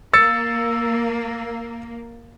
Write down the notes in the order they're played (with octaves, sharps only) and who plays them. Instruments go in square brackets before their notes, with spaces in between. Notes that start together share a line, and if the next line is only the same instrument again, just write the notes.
[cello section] A#3 [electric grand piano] E6 A6 C#7